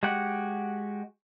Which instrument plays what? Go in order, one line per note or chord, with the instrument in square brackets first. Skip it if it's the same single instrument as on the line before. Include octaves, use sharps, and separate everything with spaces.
[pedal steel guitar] G#3 F#4 G4 F#5